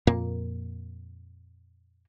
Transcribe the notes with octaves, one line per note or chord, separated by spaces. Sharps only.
F2 A#2 A#3